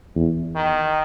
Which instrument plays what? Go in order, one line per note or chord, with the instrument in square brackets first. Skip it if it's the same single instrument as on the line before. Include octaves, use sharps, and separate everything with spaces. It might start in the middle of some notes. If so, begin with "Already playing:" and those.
[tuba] E2
[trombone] D#3